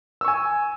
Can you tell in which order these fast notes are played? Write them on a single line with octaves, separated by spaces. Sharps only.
E6 C#6 G#5